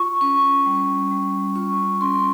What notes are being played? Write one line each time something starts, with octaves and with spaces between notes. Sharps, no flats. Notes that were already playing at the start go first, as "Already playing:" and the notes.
Already playing: F4 C#6
C#4 C#6
G3
G3
F4 C#6
C#4 C6